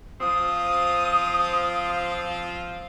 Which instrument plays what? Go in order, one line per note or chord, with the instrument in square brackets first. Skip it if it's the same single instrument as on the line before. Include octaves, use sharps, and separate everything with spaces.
[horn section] F3 C4 F4 [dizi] D#6